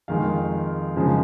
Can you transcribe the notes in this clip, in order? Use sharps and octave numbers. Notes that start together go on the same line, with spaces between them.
F2 D#3 G#3 F5
F#2 C#3 F3 G#3